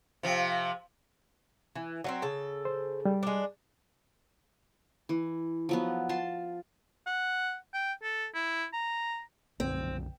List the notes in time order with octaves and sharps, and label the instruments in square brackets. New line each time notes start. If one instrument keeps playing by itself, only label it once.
[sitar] C3 F3
[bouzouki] E3
F#3 A3 C4
C#3 A4
[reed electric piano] C5
G3
[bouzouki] G#3 D4
[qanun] E3
F3 F#3 B3
F4 A5 C6
[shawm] F#5
G5
A4
E4
A#5
[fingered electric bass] B1 F#2 D3 [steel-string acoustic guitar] C4